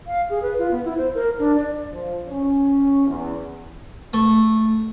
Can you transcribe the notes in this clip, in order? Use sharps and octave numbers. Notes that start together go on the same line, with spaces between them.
F5
G#4
B4
F4
B3
E4
C5
A#4
D4
D5
F3
C#4
E2
A3